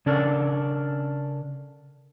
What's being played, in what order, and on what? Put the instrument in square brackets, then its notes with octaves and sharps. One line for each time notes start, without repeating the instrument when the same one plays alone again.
[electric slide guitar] C#3 C#4 D4 A4 A#4 D5